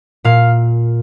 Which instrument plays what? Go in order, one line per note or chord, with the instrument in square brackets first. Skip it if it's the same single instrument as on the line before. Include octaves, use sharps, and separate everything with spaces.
[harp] A#2 F5